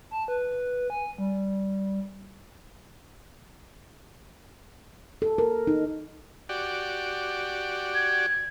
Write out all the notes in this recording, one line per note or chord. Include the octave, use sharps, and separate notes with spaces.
A5
B4
G#5
G3
A4
A#4
D#4
F#4 G4 D5
G#6